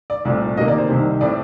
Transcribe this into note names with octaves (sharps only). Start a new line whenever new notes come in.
D5
C2 A#2 A3 C4 D5
D2 C3 D#3 A#3 D#5
D5
C5
C2 C3 D#3
A2 A3 C4 D5